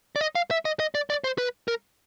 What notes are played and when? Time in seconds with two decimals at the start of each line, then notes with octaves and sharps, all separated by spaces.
0.16 D5
0.21 D#5
0.35 F5
0.51 E5
0.65 D#5
0.80 D#5
0.95 D5
1.10 D5
1.24 C5
1.38 B4
1.68 A#4